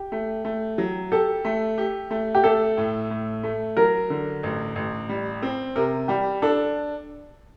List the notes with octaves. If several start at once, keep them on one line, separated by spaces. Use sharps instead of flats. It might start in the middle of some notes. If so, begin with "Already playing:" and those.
Already playing: G4
A3
A3
F#3
G4 A4
A3
G4
A3
G4
A3 A4
A2
A2
A3
F#3 A#4
D3
A1
A1
G3
C4
C3 A#4
G3 G4
D4 A4